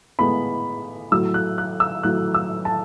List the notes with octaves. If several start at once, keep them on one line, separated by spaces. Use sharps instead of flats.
A2 G#3 B3 B5
A2 F#3 A3 E6
F#6
F#6
E6
A2 F#3 A3 F#6
E6
A5